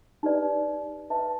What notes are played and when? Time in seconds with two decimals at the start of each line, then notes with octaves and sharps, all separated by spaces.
0.23 D#4 G4 B4 D5
1.10 B4 E5 A5